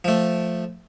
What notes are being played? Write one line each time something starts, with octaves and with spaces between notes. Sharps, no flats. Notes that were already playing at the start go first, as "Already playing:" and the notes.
F3 A3